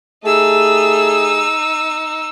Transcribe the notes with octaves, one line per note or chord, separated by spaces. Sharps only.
A3 D#4 G4 G#4 E6